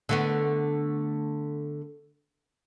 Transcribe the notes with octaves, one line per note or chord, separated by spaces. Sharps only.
D3 A3 B3